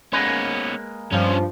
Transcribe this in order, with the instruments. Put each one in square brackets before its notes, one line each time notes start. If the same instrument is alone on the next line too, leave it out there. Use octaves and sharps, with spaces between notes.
[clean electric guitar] G#3 A#3 B4 [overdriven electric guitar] B3 C#4
[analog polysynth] G2 F3 [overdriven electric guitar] C#4 D4